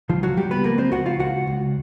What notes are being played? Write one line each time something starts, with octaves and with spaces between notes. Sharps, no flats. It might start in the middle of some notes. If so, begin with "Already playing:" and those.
C#2 F3 F4
F#3 F#4
C#2 G3 G4
B3 B4
F3 A#3 A#4
C4 C5
C#2 F#4 F#5
F4 F5
C#2 F#4 F#5
C#2